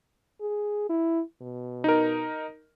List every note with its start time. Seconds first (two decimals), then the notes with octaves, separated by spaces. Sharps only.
0.41 G#4
0.89 E4
1.42 B2
1.84 D#4 A#4